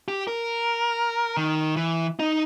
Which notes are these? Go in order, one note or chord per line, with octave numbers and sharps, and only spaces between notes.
G4
A#4
D#3
E3
D#4